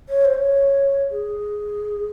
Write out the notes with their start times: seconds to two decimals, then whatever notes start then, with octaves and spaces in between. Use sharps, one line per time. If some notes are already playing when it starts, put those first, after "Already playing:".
0.09 C#5
0.25 C5
0.34 C#5
1.11 G#4